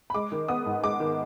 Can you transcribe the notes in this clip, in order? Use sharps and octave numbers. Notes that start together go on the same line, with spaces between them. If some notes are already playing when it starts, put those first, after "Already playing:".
B5
G#3 D6
D#3
B3 D#6
G#2
G#3 D6
D#3